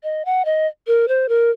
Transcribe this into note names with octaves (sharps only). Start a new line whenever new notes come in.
D#5
F#5
D#5
A#4
C5
A#4